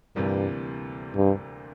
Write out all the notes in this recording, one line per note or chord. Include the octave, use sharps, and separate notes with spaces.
D2 G2 C3 E3 G3 A#3
G2